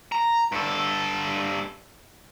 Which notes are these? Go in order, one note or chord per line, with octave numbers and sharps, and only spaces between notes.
A#5
G2 A4